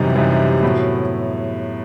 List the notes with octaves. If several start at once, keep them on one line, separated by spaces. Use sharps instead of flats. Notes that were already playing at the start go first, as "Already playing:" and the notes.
Already playing: F#2 C3 E3 G3 D#4
F#2 E3 G3 D#4
A2 F#3 B3 E4